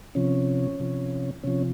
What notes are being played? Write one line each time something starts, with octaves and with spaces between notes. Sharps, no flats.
C3 F3 C#4
C3 F3
C3 F3 C#4